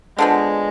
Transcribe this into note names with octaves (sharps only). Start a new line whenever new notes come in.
D3 F3 G#3 B3